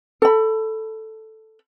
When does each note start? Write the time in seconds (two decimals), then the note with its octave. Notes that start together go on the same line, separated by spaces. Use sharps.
0.22 A4 B5